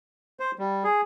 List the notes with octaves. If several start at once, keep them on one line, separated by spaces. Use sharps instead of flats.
C5
G3
G#4